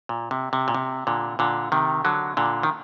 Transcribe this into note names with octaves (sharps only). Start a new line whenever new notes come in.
A#2
C3
C3
A#2
C3
A#2 D3
A#2 D3
C3 D#3
D3 F#3
A#2 D3
D#3